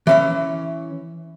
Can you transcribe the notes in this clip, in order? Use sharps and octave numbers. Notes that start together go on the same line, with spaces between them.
E3 C#4 E5